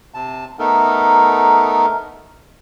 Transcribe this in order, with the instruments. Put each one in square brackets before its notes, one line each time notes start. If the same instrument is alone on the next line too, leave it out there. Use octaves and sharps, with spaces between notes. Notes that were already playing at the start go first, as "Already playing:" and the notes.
[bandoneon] C3 A5
A3 B3 D#4 A4 A#4